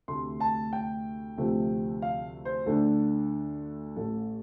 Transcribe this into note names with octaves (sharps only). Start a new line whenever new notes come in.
D2 C3 A3 D4 C6
A5
G5
D2 C3 F3 A3 C4
F5
C5
D2 D3 A3 D4 A4
A1 A2 A3 A4